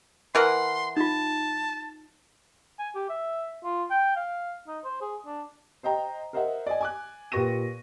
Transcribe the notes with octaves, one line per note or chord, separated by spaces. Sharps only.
E3 A#4 F#5 C6
D#4 F4 A5
G#5
G4
E5
F4
G5
F5
D#4
C5
G#4
D4
C5 D#5 G5 A#5
A#4 C5 D#5 E5 F#5
D5 D#5 G#5
G#5 D6 F#6
A#2 G4 B4 C#6 A#6 D#7